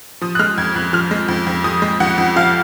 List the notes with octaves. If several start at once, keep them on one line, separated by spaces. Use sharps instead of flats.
F3 D#6
F#6
G#3 F6
F2 G#6
F2 F#6
F3 F6
G#3
F2
F2
F3 D#6
G#3
F2 F#5
F2
F3 F5